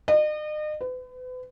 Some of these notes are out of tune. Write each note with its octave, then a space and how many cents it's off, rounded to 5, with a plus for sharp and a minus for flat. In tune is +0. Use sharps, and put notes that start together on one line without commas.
D#5 -40
B4 +40